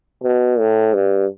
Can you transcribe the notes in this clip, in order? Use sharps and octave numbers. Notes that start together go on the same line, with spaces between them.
B2
A2
G2